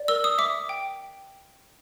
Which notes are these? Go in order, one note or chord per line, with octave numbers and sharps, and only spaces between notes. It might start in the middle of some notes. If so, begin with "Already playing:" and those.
Already playing: D5
A#4 E6
D#6
E5 D6
G5